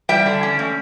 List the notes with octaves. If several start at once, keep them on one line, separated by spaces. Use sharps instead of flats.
G3 E5 G5
D3
C#4
A3